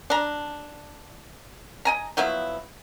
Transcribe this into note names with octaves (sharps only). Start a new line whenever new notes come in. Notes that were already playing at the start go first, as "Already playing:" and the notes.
D4 A#5
D#5 G#5 A#5
F3 F#3 B3 E4